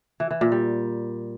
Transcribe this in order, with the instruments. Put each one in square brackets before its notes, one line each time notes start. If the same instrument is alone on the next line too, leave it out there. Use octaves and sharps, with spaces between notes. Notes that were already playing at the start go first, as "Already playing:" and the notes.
[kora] E3
E3
A#2
G3